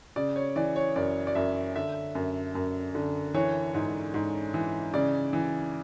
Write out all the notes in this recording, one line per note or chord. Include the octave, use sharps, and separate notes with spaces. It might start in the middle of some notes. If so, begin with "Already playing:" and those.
C#3 D5
C#5
E3 D5
C#5
F#2 D5
D5
F#2 E5
D3 E5
F#2
F#2
D3
E3 C#5
G#2
G#2
E3
C#3 D5
E3